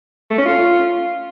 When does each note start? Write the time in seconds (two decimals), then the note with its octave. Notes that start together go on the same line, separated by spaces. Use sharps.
0.30 A3
0.38 C#4
0.46 F4